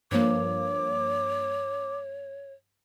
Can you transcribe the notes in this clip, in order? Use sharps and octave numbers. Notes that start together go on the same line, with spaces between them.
G2 F3 A#3 C#5 D6